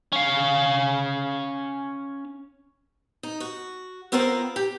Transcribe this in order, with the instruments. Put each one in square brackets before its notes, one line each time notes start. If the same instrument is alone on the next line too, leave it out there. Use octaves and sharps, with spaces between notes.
[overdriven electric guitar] C#4 F5
[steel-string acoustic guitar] D#4
F#4
B3 C4 F4 A#4 C5
G4